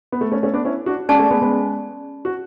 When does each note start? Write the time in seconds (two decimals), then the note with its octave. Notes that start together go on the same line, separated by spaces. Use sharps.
0.12 B3
0.21 A3
0.32 A3 C#4
0.43 A3 C#4
0.53 B3 D4
0.65 C#4 E4
0.86 D4 F#4
1.09 G#3 C#4 G#4 D5 A5 C#6
1.19 A3
1.31 G#3 B3
1.42 G#3 B3
2.25 F#4